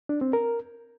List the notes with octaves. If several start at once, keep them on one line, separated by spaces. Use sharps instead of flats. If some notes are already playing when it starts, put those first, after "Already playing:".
D4
C4
A#4